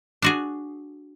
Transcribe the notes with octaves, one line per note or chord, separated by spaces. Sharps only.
D4 F#4 G#4